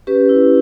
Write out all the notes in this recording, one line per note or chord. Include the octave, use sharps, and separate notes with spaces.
C#4 G4 B4
E4